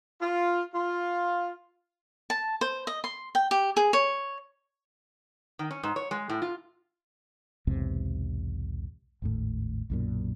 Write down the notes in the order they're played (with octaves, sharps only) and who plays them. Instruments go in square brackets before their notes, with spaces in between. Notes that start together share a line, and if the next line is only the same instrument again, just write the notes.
[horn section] F4
F4
[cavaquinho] A5
C5
D#5
C6
G5
G4
G#4
C#5
[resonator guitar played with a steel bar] D#3
C#4
G#2
C#5
G#3
A2
F4
[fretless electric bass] B1 E2 G#2 C3
G#1 D#2 A2
B1 F#2 A#2